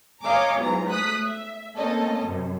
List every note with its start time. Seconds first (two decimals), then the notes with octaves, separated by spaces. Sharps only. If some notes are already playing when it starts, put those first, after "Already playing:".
0.22 C#5 D#5 F5 G#5 A#5 D6
0.59 G#2 B2 E3 F#3 F4 A#5
0.90 A3 D#6 F#6 B6
1.23 E5
1.76 A3 A#3 C4 C#4 A4 D#5
2.24 F#2 C3